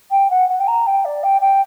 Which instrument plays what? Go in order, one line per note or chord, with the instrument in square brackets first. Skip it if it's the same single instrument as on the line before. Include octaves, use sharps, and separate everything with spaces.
[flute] G5
F#5
F#5
G5
A#5
G5
D5
G5
G5